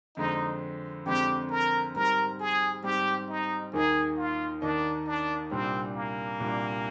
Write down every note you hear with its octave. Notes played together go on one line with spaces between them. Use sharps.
F2 D3 G#3 C4 D#4
F2 D3 G#3 C4 G4
A#4
G#2 G3 C4 A#4
G#4
G#2 G3 C4 G4
D#4
D#2 D#3 A#3 D#4 G#4
F4
D#2 D#3 A#3 D4 D#4
D4
C2 A#2 G3 C4 D4
A#3
C2 A#2 G3 D4